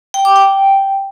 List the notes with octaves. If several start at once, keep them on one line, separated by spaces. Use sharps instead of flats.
G5
D6
G5